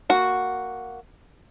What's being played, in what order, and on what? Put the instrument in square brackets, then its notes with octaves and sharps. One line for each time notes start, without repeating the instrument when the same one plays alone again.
[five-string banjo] A#3 F#4